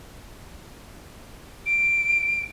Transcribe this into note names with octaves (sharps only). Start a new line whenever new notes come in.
D7